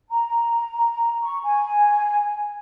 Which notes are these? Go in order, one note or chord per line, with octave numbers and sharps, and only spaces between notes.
A#5
C#6
G#5